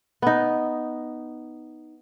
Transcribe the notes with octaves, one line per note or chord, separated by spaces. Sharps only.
B3 D#4